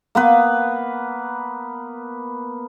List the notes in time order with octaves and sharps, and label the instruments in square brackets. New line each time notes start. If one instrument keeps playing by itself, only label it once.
[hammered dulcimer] A#3 B3 B4